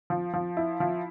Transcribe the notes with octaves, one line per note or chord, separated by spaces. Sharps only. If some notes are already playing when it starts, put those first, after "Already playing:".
F3
F3
E4
F3